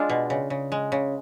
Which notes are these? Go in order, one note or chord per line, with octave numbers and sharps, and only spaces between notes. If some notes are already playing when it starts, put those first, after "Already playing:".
Already playing: G#3 D4 F4
B2
C#3
C#3
G#3
C#3